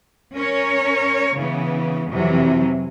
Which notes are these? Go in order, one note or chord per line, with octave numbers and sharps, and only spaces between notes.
C#4 A#4 C#5
C#3 E3 B3
F2 C3 E3 F#3